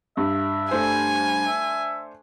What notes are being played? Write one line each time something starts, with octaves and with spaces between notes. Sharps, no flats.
G2 E5
A3 D4 C5 G#5
E5